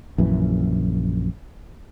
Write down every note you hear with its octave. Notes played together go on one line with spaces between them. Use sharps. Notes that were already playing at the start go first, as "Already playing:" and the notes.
A#1 F#2 E3